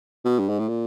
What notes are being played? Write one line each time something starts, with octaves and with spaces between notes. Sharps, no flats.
B2
G2
G#2
A2
A#2